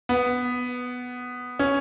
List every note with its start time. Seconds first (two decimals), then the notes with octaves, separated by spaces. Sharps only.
0.09 B3
1.59 C#4